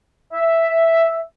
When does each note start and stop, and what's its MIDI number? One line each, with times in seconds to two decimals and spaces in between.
0.33 1.22 76